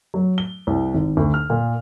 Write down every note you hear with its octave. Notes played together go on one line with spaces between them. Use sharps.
F#3
G7
C2
G#1
D2
F6
A#2